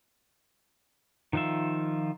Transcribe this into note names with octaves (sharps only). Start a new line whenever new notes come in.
D#3 F3 D#4 F4 E5